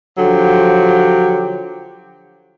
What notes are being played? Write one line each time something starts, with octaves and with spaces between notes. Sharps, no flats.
D3 F3 F#3 G4